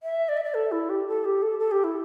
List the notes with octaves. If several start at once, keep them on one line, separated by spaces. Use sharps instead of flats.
E5
D5
E5
D5
A4
E4
G4
A4
G4
A4
A4
G4
E4